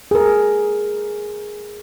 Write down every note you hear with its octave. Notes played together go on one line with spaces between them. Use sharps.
G#4 A#4